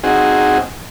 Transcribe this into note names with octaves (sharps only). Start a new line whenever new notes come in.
C4 D#4 F#4 G#4